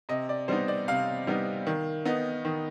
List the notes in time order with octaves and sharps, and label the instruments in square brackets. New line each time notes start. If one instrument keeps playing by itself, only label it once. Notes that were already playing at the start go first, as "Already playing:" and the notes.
[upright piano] C3 D#5
D5
G3 B3 D#4 C5
D5
C3 F5
G3 B3 D#4
D#3
B3 D#4
D#3